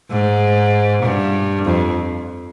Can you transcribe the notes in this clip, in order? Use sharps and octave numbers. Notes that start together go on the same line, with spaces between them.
G#2
G2
F2